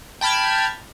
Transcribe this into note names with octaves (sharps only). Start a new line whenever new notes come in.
G5 A5 B5 F6 G#6